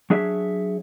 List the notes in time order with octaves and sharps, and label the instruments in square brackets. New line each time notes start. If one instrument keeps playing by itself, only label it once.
[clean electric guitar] F#3 D4 G#4 C#5 E5